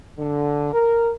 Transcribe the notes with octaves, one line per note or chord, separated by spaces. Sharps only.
D3
A#4